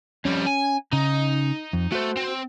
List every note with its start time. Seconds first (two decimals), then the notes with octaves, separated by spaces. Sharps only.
0.25 F2 G3 C#4
0.46 G#5
0.93 C#3 D#4
1.73 F2
1.92 A3 F#4 C5
2.17 C4